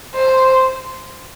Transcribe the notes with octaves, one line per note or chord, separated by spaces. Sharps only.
C5